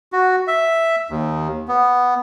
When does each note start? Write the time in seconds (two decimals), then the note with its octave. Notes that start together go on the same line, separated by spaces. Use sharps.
0.12 F#4
0.47 E5
1.10 D#2
1.68 B3